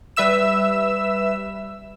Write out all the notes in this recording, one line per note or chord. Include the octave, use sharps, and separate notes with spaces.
G3 B4 E5 E6 E7